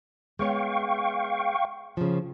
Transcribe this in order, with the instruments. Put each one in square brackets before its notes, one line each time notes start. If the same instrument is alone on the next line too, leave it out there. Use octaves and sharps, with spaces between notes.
[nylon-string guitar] G#3 B3 C#5 [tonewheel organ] F5 G5 C#6
[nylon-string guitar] C#3 F3